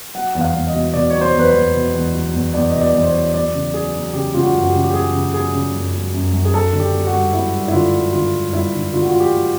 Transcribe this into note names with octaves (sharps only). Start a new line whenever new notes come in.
F#3 F#5
E2
F5
E2
D#5
B2
B2 D5
F#3 C#5
C5
E2 B4
C5
E2
B2
E2
F#3
E2
E2 D5
D#5
B2
D5
E2
C5
C#5
F#3
F#3 D5
C#3
F#3 G#4
F#3
C#3 G4
C#3 F4
F#4
F#2 F#4
G4
C#3
G4
F#3 G#4
C#3
F#3 G#4
C#3
F#2
F#3
F#2
F#2
G#4
F#3 A4
D3
G4
F#3
F#4
G2
F#3 E4
G2
E4
D3 F4
F#3
D3 F4
G2
G2 E4
D3
D3 F4
F#4
F#3 F4
G4
F#3